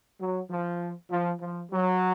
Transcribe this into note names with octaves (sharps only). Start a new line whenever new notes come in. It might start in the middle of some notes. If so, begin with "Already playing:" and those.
F#3
F3
F3
F3
F#3